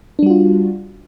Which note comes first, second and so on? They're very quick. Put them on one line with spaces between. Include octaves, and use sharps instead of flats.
D4 G3 F#4 F4